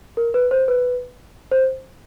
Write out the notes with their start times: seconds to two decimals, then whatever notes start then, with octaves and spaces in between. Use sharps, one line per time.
0.17 A#4
0.34 B4
0.51 C5
0.68 B4
1.51 C5